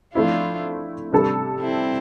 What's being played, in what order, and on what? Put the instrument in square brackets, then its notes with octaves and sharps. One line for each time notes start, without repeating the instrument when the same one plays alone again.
[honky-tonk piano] F3 A3 C4 E4 [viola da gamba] D4 F4
[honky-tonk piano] C3 G3 D4 A4
[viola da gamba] C4 E4